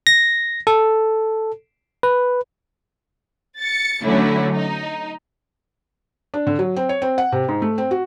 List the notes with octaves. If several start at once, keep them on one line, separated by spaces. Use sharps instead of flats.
A#6
A4
B4
A6 C#7
D3 F#3 A3 C#4 E4
D#4
D4
D3
F#3
C4
C#5
C4
F#5
C3
G#2
A3
C4
F#4